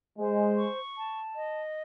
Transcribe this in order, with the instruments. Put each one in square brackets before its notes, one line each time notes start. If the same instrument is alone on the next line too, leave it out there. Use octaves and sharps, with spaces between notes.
[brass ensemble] G#3 [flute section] C5
[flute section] C#6
A5
D#5